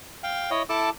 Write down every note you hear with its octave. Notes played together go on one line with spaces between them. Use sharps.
F5 G5
E4 C#5 D#5
E4 A4 A5 D6